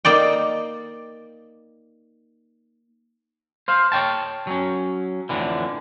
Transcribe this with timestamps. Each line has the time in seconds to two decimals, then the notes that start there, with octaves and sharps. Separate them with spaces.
0.05 A#3 D#4 D5 G5
3.68 C5 F5
3.92 C#5 D5 G5 A5
4.47 F#3 C#4
5.29 F2 A2 D3 E3